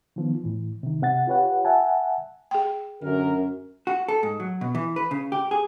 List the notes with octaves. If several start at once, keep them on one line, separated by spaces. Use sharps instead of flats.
D#3 F3 B3
A2 E3
C3 D#3
C3 F#5 A6
F4 G4 B4 C#5 F#5
E5 F#5 G#5 A5
G#4 G5
F#2 D3 A#4
F#4
A4
G#2
F#3
B2
E3
B4
C#3
G4
G#4